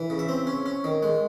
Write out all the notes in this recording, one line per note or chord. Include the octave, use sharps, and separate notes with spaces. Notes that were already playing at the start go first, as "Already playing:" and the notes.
Already playing: E3
C#3
E5
C4
C#4
C#4
D#3
G#3